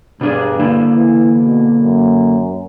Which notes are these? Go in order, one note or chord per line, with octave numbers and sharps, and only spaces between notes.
G2 B2 D4 G#4
D3 A#3 E4
E3
B2
F#2